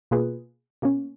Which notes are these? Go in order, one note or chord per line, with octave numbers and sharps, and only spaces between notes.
B2 A#3 F4 G#4 B4
B2 A#3 C#4